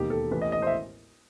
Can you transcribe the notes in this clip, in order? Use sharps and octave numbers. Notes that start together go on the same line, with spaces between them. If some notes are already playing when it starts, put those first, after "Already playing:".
Already playing: E1 D#2 D#3 G4
A4
A1 A2 E3 B4
D#5
D#5
C5
E5